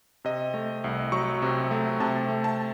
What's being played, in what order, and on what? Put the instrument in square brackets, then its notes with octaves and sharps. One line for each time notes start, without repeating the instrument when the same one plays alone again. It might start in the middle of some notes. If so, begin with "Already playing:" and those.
[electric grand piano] C3 D#5
A3
C2
F#3 C#6
C3
A3
C3 A5
A3
A5